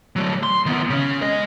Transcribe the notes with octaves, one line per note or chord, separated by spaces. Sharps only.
F#3 A3
C6
D#3 B3
C#3 C#4
G#3 D#5